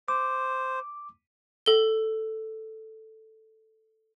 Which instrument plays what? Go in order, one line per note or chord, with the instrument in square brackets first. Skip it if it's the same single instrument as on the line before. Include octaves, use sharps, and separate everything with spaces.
[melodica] C5 [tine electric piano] D6
[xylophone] A4 G7